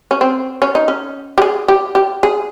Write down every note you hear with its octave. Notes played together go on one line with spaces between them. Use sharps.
C#4
C4
C#4
D#4
C#4
G4
G#4
G4
G4
G#4